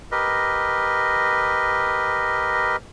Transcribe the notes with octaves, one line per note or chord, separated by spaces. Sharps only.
G4 A#4 B4 D#5